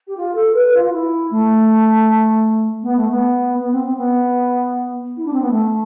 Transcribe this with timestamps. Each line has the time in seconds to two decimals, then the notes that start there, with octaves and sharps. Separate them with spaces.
0.07 G4
0.17 F4
0.35 A4
0.54 B4
0.74 F4
0.85 F4
0.92 E4
1.30 A3
2.82 B3
2.96 A3
3.10 B3
3.59 B3
3.71 C4
3.84 C4
3.97 B3
5.16 E4
5.25 D4
5.33 C4
5.41 B3
5.50 A3